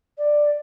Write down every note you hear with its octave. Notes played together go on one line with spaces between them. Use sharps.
D5